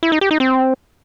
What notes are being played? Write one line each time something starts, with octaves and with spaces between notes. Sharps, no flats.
E4
D#4
G4
D#4
C4